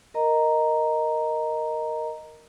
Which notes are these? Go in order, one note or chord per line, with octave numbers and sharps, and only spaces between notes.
A#4 D#5 A#5